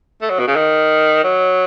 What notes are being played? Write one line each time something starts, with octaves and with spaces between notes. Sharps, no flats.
A3
F#3
B2
C#3
D#3
F#3